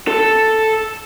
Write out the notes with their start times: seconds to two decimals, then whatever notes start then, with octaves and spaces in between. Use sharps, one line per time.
0.07 A4